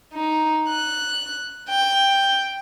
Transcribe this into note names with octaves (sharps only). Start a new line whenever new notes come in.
D#4
F#6
G5